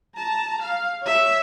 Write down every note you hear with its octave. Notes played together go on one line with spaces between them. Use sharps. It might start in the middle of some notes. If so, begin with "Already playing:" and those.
A5 A#5
F5
C#5 E5